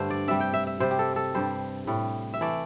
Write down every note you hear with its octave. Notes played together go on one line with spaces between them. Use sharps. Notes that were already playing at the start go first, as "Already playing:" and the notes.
Already playing: G2 D3 A3 C5
D5
C3 G3 E5
G5
E5
E5
C3 G3 C5
G4
A4
A4
G2 G3 C5
A2 G3
E5
E3 A3 D5